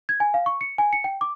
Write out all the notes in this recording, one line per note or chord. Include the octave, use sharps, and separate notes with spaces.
G#6
G#5
F5
C#6
C#7
G#5
C#7
G5
D6